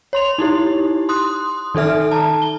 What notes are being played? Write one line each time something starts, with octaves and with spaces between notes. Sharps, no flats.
C#5 C6 F7
D#4 E4 G4
C6 D#6 F#6
D#3 D#4 A4 E5 F6
A5 A#5
G7